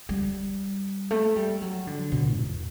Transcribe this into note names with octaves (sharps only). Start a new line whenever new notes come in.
G3
A3
G3
F#3
D3
B2
E2